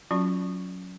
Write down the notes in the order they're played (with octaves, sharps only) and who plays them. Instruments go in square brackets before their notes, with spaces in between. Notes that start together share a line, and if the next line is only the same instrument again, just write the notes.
[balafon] F#3 C#4 F4 F#4 B5 C#6